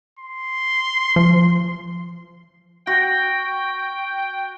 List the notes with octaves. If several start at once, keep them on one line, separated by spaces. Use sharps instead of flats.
C6
F3
F#4 G5